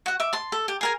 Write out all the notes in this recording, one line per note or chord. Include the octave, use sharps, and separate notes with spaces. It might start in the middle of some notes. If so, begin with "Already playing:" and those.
F#4 F#5
E5 D6
A5 C6
A4
G4
G#4 A#4 G#5